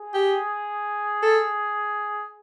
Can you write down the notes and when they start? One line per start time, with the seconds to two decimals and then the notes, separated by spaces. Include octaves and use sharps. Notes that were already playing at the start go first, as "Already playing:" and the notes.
Already playing: G#4
0.14 G4
1.22 A4